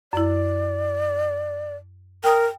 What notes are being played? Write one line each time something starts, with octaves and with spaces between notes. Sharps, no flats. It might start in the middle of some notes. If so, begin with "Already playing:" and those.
F#2 E4 D5
A#4 G5 D#6